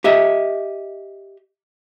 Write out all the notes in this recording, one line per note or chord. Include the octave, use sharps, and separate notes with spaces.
G4 D#5 E5